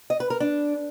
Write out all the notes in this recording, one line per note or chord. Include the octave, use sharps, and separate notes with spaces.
D#5
B4
A#4
D4